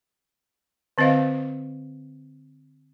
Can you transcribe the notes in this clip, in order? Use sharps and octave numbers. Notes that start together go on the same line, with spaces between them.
D3 C4 C5 D#5 F5